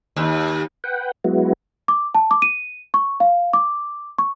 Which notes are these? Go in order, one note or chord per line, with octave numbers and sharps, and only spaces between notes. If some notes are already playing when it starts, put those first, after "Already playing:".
D#2
B4 F#5 G5
F#3 G#3 B3 E4 F#4
D6
A5
D6
D#7
C#6
F5
D6
C#6